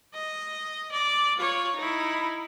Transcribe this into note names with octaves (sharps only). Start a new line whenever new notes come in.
D#5
D5
F4 C#5
D#4 E4